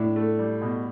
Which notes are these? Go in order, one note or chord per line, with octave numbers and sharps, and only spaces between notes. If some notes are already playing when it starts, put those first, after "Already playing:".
Already playing: A2 D4
A3
G3
B2